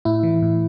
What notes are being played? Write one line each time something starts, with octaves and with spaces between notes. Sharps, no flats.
A2 E4
E3
A2